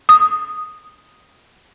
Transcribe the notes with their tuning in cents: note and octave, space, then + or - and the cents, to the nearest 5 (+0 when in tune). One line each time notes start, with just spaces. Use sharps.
D#6 -5